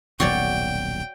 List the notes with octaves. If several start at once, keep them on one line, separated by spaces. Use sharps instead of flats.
D#1 B1 A2 F#4 C#5 D5 G5